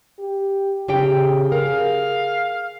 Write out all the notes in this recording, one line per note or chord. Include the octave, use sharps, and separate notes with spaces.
G4
C#3 G4 G#4 G5
A#4 F5